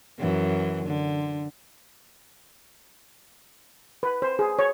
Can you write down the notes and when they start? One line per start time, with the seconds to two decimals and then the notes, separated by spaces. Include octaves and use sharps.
0.19 F#2 E3
0.85 D3
4.03 B4
4.22 C5
4.39 G#4
4.59 C#5